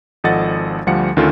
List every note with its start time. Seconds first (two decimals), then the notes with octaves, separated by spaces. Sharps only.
0.24 G#1 F3 A4 D#5 F#5 A6
0.87 D2 F3 G3 F5 F#5 C#7
1.17 D2 D#3 C#4 F4 A4